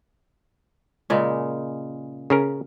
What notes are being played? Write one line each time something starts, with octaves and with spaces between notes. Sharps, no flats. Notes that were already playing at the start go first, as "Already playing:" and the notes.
A#2 C#3 G#3
C#3 C#4 A#4